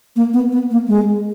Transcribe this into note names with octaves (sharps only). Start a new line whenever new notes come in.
A#3
B3
B3
A#3
G#3